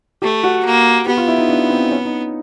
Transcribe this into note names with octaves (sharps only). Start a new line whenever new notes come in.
A3 G4
F#4
A#3
B3 G4
F4
E4
D#4
D4
C4
C#4
D#4